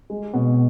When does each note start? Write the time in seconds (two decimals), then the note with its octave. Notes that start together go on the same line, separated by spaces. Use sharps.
0.10 G#3
0.34 B2